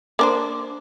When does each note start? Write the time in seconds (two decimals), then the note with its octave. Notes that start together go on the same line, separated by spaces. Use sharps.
0.19 A#3 D4 C5